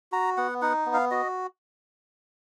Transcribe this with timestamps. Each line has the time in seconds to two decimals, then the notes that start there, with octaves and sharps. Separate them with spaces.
0.12 F#4 A#5
0.37 B3 F#5
0.62 D#4 F#5
0.86 B3
0.94 F5
1.11 F#4 D#5